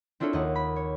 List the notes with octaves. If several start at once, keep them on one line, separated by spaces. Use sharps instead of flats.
C4 D4 E4 F4 A4 C#5
D#2 A#3 D#5 F#5
B5
C#5